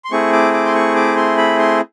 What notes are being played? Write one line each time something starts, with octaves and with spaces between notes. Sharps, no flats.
C6
A3 C4 E4 G#4 C#6
D6
D6
C6
C#6
D6
C6
B5
C6